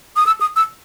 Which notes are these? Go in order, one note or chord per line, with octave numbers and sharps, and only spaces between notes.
D#6
E6
D#6
E6